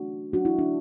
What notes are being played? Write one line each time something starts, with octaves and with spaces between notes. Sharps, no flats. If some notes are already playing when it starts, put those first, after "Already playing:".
Already playing: E3 A3 C#4 D4 F#4
F#3 C#4 D4 F#4
E4
D4